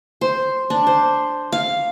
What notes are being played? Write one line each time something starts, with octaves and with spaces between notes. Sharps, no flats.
C5
D4
C5
F5